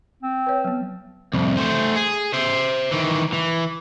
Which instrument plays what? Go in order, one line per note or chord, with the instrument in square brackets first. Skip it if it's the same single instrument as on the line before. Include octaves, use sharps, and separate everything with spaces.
[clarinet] C4
[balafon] B4 C#5
F#3 B3
[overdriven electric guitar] C2 F2
A3 C5
G#4
C5 E5
D#3 E3
E3